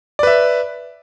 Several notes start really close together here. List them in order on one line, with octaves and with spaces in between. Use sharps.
D5 B4 E5